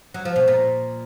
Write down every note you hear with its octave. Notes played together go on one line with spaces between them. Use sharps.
F#3
F3
B2
A#2